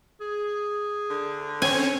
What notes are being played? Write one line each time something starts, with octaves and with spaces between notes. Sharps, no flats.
G#4
D3
C4 C#4 C#5 G#5